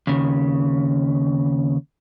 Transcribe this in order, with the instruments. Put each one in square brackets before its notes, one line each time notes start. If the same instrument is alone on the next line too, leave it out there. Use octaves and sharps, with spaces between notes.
[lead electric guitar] D#2 C#3